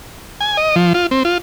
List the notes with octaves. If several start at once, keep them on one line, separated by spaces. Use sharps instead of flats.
G#5
D#5
F3
F4
C4
F4